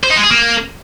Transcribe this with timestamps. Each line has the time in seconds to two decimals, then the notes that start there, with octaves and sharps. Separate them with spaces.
0.03 C5
0.10 D#4
0.17 G#3
0.24 G#4
0.30 A#3